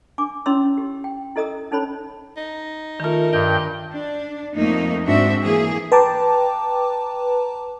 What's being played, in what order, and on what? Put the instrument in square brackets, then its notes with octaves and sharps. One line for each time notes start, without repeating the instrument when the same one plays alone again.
[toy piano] D4 G#5 D6
C#4 E4 C#5 C6 E6
G4
G5
E4 A4 D#5 A#5 D#6 E6
C#4 D#4 A4 C5 C#5 B5
[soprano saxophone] D#4
[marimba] D#3 F4 [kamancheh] A3 A#4
[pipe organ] G2 G5 [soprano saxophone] D#5
[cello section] D4
F2 A3 A#3 D#4
G#2 C4 D4 F#4 E5
E3 A#3 G#4
[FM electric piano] B4 G5 A5 A#5 D6